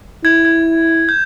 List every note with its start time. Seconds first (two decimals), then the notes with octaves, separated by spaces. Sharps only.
0.24 E4 G#6
0.45 G#6
1.09 G6